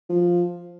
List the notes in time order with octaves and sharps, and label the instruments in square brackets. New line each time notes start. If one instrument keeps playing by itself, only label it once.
[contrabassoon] F3